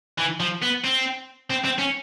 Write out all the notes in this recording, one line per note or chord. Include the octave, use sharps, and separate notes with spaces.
E3
F3
B3
C4
C4
C4
C#4